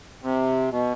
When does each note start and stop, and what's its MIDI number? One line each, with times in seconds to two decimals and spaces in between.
0.22 0.70 48
0.71 0.93 47